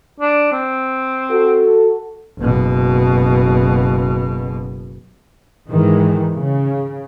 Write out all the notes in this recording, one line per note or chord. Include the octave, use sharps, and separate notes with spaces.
D4
C4
F#4 A4
F#1 B2
G#2 D#3 E3 G#3
C#3